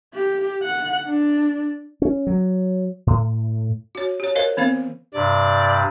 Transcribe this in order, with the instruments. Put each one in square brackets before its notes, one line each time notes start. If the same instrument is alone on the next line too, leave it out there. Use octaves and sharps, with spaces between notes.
[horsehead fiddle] G4
F#5
D4
[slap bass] C#4
F#3
A2
[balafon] F#4 C#5
G4 C#5
A#4 C5 C#5 D#5 F5
E3 B3 C4 C5 F5
[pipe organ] G2 C3 [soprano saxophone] D5